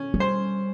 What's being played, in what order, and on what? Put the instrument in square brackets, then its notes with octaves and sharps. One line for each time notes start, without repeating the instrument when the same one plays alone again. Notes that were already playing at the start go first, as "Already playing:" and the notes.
Already playing: [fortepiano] C#4
[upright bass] G3
[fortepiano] C5